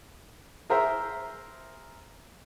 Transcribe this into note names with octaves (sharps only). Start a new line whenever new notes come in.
G#4 A#4 C5 E5